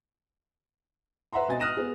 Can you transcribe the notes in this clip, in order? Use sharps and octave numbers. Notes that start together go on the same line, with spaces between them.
B4 E5 F#5 A#5 C6
B2 C4 D#5 G#5 A6
D#6 F6 F#6 A#6 D#7 E7
B3 G#4